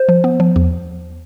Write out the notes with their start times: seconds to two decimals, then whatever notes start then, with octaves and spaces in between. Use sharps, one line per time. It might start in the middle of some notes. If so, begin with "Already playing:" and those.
Already playing: C5
0.09 F3
0.24 B3
0.40 F3
0.56 E2